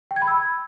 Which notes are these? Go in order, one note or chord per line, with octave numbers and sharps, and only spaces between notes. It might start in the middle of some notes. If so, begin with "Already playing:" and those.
G5
G#6
B5
E6